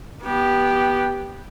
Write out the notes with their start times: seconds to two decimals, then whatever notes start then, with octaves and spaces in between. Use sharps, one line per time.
0.23 B3 G4